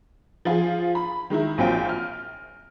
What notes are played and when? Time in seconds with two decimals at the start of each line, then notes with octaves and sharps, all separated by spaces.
0.45 F3 F4 G#4
0.95 B5
1.30 D#3 G#3 D#4 E4
1.58 A#1 F#3 C4 F4 G5
1.89 F6